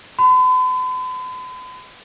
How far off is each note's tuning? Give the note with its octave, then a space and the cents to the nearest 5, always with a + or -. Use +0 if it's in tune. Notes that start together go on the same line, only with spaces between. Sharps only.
B5 +45